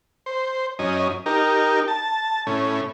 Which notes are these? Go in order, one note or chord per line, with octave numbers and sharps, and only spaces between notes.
C5
F#2 C#4 D#5
D#4 G4 A#4
A5
A2 C#4